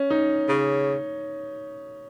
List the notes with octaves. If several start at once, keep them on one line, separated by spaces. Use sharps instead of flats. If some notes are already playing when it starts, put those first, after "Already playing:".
Already playing: C#4
D#4
C#3